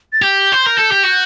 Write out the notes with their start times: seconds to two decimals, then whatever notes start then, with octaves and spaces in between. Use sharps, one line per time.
0.13 A6
0.22 G4 G6
0.52 C5
0.66 A#4
0.78 A4
0.91 G4
1.03 F#4